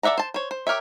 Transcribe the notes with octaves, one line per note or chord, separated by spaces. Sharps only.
A4 D5 E5 F#5 A#5
C5 A5
C5 C#5
C5
G4 A#4 C#5 E5